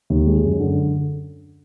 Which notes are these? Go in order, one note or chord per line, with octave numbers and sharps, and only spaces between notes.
D#2
G#3
F#2
D3